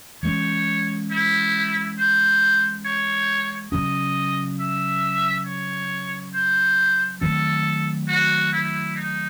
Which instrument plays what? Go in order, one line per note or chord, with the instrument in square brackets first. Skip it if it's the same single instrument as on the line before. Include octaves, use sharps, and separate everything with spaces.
[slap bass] E3 G#3 C#4 [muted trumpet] C#5
[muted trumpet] E4
C5
C#5
[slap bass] C#3 F#3 C#4 [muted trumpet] D#5
[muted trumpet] E5
C#5
C5
[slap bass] D#3 F#3 A3 C4 [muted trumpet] A4
[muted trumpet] F#4
E4
D#4